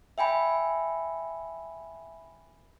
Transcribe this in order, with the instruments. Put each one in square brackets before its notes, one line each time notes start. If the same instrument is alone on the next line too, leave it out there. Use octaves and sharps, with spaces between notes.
[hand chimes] E5 G5 G#5 B5